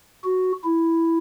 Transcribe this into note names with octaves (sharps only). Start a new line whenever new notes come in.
F#4
E4